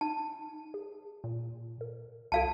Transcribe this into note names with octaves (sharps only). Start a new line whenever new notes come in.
D#4 A5
G#4
A#2
A#4
C2 A4 F5 A5